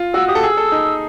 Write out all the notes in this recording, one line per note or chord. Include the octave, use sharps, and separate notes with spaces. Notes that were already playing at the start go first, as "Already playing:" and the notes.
Already playing: F4
F#4 E6
G4 D#6
A4
G#4 E6
A4
D#4